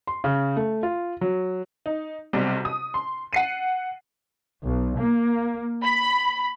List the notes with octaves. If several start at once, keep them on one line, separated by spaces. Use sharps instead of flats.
C6
C#3
A3
F4
F#3
D#4
B1 C3 G3
D#6
C6
F#5 C7 D#7
B1
A#3
B5